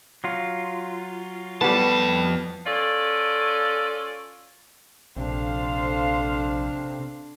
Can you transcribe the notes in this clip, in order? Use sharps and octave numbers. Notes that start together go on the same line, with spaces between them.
F#3 F4
F2 A2 G3 B3 A5
C#4 F4 A4 D5
A#1 C3 D4 A4 C5 F5